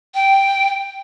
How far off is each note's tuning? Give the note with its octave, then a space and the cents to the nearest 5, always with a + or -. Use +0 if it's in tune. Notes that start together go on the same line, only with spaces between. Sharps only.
G5 -5